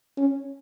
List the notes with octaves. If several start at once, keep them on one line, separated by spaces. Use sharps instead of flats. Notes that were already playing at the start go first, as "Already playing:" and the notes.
C#4